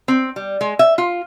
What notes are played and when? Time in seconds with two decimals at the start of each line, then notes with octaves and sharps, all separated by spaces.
0.08 C4
0.36 G3
0.61 G#3
0.79 E5
0.98 F4